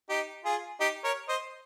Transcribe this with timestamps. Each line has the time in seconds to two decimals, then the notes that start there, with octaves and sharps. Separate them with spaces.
0.09 D#4 G4
0.45 F4 G#4
0.80 D#4 G4
1.04 A#4 C#5
1.28 C5 D#5